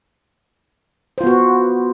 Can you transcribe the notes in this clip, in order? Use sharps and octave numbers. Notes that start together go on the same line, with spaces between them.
B3 F4 F#4 C5